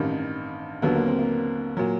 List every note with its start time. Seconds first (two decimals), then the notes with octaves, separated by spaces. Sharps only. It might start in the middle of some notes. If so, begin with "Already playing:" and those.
Already playing: A1 G2 D#3 C4
0.82 D#2 D3 F#3 B3
0.95 A#3
1.06 C4
1.19 A#3
1.77 A#2 F#3